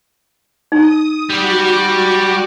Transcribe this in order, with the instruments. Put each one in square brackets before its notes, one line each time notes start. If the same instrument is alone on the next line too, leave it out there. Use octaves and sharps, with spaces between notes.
[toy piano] D#4 [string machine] D#6
[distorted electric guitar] G3 [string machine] F#4 D6